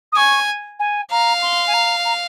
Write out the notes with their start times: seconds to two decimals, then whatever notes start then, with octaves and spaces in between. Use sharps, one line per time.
0.12 D#6
0.16 G#5 C#6
0.79 G#5
1.11 F5 A#5
1.42 C6
1.67 G#5
1.73 A#5
2.04 A#5